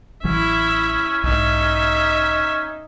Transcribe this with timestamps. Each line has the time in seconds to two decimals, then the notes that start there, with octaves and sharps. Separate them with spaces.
0.24 A1 E3 F#3 C#4 E4 E5
1.24 B1 G#2 D#4 E5